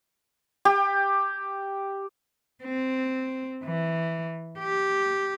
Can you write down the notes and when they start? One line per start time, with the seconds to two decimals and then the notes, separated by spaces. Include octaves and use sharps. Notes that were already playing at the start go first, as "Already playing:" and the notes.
0.65 G4
2.64 C4
3.64 E3
4.59 G4